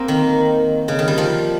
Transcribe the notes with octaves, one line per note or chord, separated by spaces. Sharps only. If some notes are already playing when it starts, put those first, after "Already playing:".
Already playing: A#3 C4
D#3
C#3
D#3
G3
F3